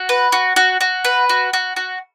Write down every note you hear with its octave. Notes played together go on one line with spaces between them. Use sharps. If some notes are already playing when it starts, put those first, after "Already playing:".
Already playing: F#4
B4
F#4
F#4
F#4
B4
F#4
F#4
F#4